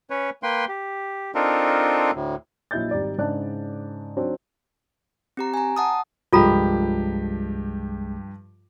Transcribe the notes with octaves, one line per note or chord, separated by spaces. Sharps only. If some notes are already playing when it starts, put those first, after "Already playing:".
C#4 B4 C#5
A#3 B4 G5 C6
G4
C4 D4 D#4 F4 A4 A#4
D2 A2
A#1 F#3 E4 D#5 G6 A6
G#1 G3 D#4 D5
G#2 C#3 D4 D5 A5 F#6
F#3 C4 D4 D#4
C4 G4 A#5
G#5 A#5
F#5 A5 D#6
C2 G2 F3 G#3 F4 G4 A4 A#5